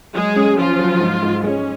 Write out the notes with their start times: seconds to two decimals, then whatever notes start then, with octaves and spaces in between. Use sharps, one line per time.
0.15 F#3 G#3 G#4
0.36 C#4
0.58 F3 C#4 F4
0.79 F#3
1.01 G#2
1.23 G#2
1.43 G#3 C#4